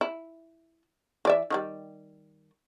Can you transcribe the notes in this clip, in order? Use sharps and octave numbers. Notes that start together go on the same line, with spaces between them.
E4
E3 D5 E5
D#3 F#3 G3